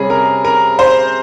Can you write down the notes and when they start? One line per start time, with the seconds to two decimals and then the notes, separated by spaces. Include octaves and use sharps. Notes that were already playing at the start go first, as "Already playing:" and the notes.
Already playing: C3 G3 C#4 G#4
0.10 A#4
0.45 A#4
0.79 C5